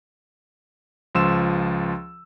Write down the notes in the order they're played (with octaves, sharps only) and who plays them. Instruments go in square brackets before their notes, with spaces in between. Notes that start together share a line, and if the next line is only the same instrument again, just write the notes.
[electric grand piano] C#2 F3 C6 E6 E7